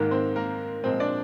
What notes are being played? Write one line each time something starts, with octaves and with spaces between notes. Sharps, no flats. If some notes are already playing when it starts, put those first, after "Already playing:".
Already playing: G#2 D#3 G#3 A#3 A#4
C4 C5
A#3 A#4
A#2 F3 G#3 C4 C5
D4 D5